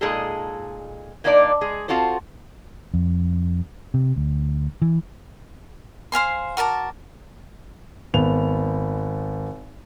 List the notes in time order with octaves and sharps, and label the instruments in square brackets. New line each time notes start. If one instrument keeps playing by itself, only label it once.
[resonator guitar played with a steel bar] A#2 G#3 D#4 G#4 A4
A#2 A#3 D4 D#4 F4 D5
G#3 G#4
C4 F4 F#4 A4 C5
[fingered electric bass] F2
C3
D2
E3
[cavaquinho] C5 F5 G#5 C6
F#4 A#4 D5 A5
[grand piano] G#1 B3 F7